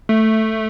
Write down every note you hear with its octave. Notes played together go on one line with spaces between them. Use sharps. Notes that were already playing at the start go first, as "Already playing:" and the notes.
A3